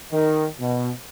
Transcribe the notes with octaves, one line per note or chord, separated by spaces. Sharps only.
D#3
B2